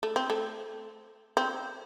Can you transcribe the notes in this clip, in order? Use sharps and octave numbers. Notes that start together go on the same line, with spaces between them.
A3
C4
A3
C4